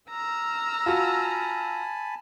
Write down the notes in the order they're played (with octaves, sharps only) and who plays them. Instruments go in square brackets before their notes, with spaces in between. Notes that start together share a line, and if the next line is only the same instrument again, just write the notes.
[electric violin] A#5 [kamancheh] E6 F6
[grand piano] F4 F#4 [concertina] G#5 A5 B5